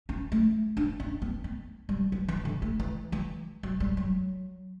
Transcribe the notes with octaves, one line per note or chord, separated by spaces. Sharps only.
C#4
A3
D4
C#4
B3
B3
G3
F#3
E3
D3
A3
E3
E3
F#3
G3
F#3